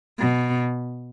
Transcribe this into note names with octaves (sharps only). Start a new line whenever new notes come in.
B2